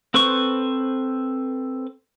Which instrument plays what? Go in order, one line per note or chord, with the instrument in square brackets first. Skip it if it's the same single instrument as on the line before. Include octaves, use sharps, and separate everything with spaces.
[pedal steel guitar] C4 A4 B4 C5 C#6